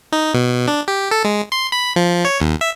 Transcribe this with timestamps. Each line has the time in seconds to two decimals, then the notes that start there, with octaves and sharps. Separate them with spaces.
0.12 D#4
0.34 B2
0.68 D4
0.88 G4
1.11 A4
1.24 G#3
1.52 C6
1.72 B5
1.96 F3
2.25 C#5
2.40 D#2
2.61 E5